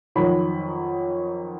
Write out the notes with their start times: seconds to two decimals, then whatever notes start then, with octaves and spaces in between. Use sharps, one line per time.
0.16 F2 D#3 F#3 B5